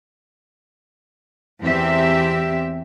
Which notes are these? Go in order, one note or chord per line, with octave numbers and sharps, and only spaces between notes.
E2 C4 G4 E5